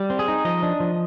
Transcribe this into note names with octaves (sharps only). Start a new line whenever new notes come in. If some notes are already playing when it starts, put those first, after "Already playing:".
Already playing: G3
C4
G#4
D#4
F3 D#5
D4
F3